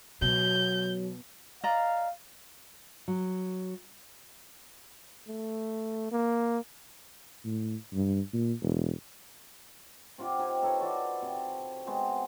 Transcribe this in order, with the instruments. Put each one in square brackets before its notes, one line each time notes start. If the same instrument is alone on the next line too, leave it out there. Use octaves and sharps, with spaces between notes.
[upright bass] B2 [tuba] F#3 [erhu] G6
[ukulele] D5 D#5 A#5 [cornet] F5
[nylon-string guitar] F#3
[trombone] A3
A#3
[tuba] A2
G2
A#2
E1
[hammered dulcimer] C3 F4 F#5 D6
C4 D#4 G4 G#5
D#4 A4 B4 C#5
F#4 A4 D5
C3
G#3 B3 C4 F#4